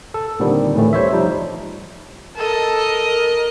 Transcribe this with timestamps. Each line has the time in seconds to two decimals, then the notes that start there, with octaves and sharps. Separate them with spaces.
0.14 A4
0.40 A#2 D3 D#3 G3 C4
0.75 A2 E3 A3
0.93 G3 C5 C#5 E5
1.13 F3 G3 D#4
2.37 A4 A#4 D#5